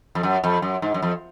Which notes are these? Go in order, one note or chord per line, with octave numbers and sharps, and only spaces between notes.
F2
F#2
F2
F#2
G#2
F#2
F2